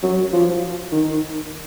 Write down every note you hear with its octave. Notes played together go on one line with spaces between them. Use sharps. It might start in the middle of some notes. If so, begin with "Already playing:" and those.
F#3
F3
D#3